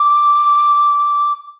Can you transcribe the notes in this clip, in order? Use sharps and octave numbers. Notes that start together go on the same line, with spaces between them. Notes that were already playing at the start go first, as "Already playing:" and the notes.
Already playing: D6